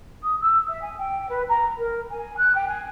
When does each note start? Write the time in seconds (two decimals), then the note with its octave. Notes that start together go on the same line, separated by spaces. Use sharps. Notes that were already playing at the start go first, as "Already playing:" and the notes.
0.23 D#6
0.41 E6
0.68 E5
0.81 G#5
0.98 G5
1.29 B4
1.48 A#5
1.77 A#4
2.10 G#5
2.37 F#6
2.55 G5
2.68 G#5